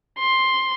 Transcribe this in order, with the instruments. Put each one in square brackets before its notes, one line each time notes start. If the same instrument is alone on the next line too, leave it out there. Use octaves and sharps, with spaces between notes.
[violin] C6